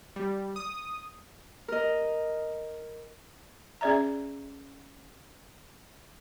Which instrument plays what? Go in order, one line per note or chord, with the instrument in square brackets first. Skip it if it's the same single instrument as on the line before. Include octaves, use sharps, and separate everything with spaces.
[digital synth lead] G3
D#6
[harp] A#4 D#5
[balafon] C#4 G#4 D5 E5 A#5